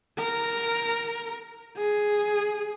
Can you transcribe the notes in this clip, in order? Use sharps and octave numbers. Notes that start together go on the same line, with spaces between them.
A#4
G#4